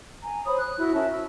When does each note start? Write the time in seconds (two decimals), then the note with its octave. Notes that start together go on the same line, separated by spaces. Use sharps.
0.23 G#5 A#5
0.46 C5 C#5 B5 D#6
0.59 F#6
0.78 E4 F#4
0.94 C#4 A#4 E5 A5
1.13 E6